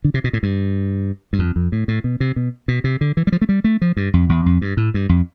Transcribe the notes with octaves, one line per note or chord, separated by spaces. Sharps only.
D3
C3
B2
A2
G2
G2
F2
F2
A2
A2
B2
C3
B2
B2
C3
D3
E3
G3
F3
A3
G3
A3
F3
G2
F2
E2
F2
G2
A2
G2
F2